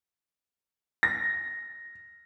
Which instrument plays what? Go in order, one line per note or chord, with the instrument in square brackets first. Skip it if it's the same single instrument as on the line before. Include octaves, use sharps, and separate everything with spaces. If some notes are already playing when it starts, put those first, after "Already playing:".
[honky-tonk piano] A#6